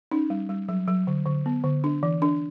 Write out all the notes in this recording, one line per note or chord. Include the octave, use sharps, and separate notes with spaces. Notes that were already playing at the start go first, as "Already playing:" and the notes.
C#4 D#4
G3
G3
F#3
F#3
D3
D3
B3
D3
D4
E3
D4